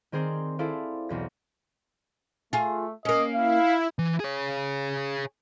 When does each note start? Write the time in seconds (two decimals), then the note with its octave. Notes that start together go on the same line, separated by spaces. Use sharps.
0.12 D#3 C4 G#4 A#4 C5 D5
0.59 E4 G#4 A4 C5 D5 F5
1.09 B1 E2 A#6
2.53 A3 F4 G#4
3.05 A#3 C#4 D#5
3.35 E4 F5
3.99 E3
4.20 G#4 C#5